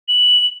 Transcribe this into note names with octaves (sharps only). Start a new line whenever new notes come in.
F#7